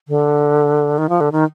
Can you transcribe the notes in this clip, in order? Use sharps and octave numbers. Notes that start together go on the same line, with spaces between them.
D3
D#3
F3
D3
D#3